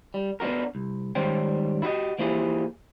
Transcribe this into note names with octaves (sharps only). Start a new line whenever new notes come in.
G3
B3 D4 D#4 F#4 A#4
C2
G#2 D#3 G3 C#4 C5 G5
E4 F#4 G4 D#5
E3 F3 A#3 E4 G4 G#4